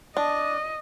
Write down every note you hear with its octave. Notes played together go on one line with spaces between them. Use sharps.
D4 D#5